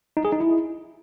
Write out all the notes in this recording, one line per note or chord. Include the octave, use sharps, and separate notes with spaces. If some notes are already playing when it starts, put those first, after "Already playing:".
D#4
G#4
D#4
E4